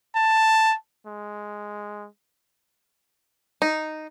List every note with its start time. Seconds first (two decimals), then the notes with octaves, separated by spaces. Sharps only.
0.15 A5
1.06 G#3
3.62 D#4